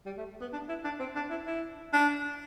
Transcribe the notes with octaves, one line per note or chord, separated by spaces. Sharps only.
G3
A3
B3
D4
E4
D4
C4
D4
E4
E4
D4